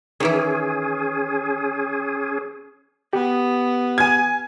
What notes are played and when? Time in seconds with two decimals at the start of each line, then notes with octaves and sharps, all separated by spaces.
0.20 D#3 E3 C#4 E4 G#4
3.13 B3 G4
3.98 G#5 G#6